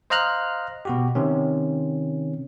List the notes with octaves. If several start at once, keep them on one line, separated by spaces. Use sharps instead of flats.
C5 D#5 F5 A#5 F6 F#6
B2 F#4 G4
C3 D#3 C#4